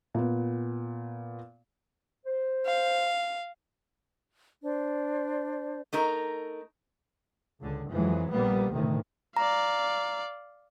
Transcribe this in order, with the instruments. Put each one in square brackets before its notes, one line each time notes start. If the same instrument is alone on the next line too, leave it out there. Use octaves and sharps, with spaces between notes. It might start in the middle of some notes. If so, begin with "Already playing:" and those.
[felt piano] A#2 B3
[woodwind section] C5
[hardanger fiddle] F5
[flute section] D4 C5 D5
[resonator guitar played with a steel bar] A3 D#4 A#4
[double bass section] C#2 D3
F2 E3 F#3 G#3
A#1 G3 A#3 B3
D2 A2 C3 D#3
[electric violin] D5 F5 [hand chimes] A#5